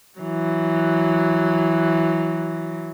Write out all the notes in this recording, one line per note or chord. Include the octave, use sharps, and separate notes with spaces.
E3 F#3